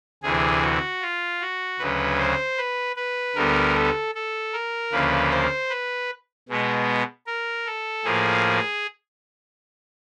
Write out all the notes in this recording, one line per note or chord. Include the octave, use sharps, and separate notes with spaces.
D2 C3 E3 G#4
F#4
F4
F#4
D2 C#3 F#3 B4
C5
B4
B4
D2 D3 G3 B3 A#4
A4
A4
A#4
D2 C#3 F3 A#3 B4
C5
B4
B2 G#3 B3
A#4
A4
A2 F3 A#3 G#4